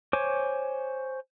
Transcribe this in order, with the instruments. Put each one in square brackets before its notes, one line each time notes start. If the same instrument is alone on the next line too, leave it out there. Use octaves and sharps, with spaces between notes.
[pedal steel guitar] C5 C#5 G#5 D6